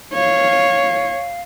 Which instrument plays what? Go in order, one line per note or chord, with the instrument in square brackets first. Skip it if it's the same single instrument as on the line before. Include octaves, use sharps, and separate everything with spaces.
[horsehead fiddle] C#5 [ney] F5